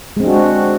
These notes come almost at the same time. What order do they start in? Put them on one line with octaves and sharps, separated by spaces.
G#3 C4 D4 F#4